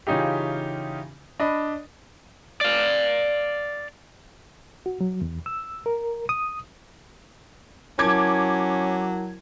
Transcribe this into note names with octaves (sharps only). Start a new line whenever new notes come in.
C#3 E3 C#4 D#4 F4 G4
D4 D#5 B5
D5 F5
F#4
F#3
E2
E6
A#4
D#6
F#3 C#4 E4 A#4 A5 D6 G#6